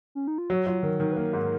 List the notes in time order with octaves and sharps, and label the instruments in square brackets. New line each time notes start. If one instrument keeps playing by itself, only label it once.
[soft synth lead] C#4
D#4
F4
[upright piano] F#3 [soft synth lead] F#4
[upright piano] F#3 [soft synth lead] F4
[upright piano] D#3 [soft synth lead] A#4
[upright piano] D#3 [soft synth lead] A#4
[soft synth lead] B4
[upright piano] A#3 [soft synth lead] A#4
[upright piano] G#2